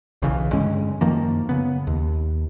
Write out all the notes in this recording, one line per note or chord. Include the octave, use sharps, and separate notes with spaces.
B1 C#3 E3
G2 D3 G#3 C#4
F#2 D#3 F3 A#3
C#3 B3
D#2